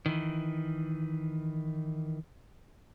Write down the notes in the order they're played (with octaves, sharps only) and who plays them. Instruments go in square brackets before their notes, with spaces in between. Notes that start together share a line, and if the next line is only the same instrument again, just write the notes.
[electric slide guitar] D#3 E3